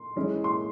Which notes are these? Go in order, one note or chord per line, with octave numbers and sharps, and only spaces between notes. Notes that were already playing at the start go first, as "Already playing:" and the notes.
Already playing: C6
E3 G#3 C#4 E4
C6